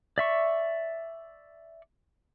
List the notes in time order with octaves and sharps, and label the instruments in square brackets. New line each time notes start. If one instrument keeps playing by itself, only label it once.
[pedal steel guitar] D5 E5 C#6